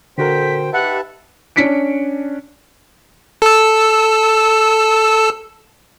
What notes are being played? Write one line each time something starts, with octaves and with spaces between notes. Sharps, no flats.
A#2 D3 F#4 A4 A#4 C5 G5 B6
D#4 G4 B4 E5 F#5 A5
C#4 D4 B6 C#7 D7
A4 E6